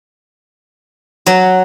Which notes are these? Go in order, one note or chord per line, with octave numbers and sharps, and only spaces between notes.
F#3